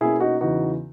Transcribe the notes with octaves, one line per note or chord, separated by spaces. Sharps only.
B2 A#3 C#4 E4 G#4
D#4 F#4
E2 C#3 E3 B3 D#4 F#4